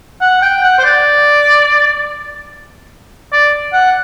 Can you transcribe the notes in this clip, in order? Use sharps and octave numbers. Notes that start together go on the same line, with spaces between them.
F#5
G5
F#5
C5
D5
D5
F#5